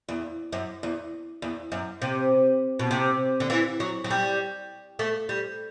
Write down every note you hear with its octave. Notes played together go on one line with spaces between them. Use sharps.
E2
F#2
E2
E2
F#2
C3
B2
C3
D3
E3
F#3
F#3
G3
A3
G3